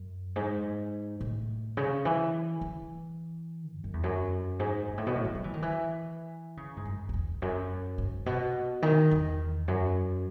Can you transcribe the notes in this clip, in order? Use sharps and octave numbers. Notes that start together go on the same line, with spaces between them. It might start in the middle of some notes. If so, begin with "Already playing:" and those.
Already playing: F#2
G#2
A2
C#3
E3
E3
E2
F#2
E2
F#2
G#2
G#2
A2
B2
A2
E3
F#3
E3
D#3
E3
C#3
G#2
F#2
F#2
E2
F#2
G#2
B2
D#3
E2
F#2